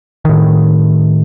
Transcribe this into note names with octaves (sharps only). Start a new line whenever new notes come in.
A2 D#3